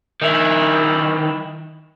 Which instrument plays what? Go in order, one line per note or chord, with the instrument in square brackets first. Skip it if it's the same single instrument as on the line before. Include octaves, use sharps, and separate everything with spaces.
[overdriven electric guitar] D#3 E4